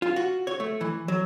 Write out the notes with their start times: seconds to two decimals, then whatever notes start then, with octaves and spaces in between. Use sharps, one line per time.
0.02 F4
0.16 F#4
0.47 C#5
0.60 A3
0.81 E3
1.08 F#3